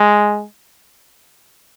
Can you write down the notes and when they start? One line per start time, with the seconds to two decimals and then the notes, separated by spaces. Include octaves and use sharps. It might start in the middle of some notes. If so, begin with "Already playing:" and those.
Already playing: G#3